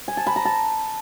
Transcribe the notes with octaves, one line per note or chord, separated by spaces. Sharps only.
G#5
A5
B5
A#5
A5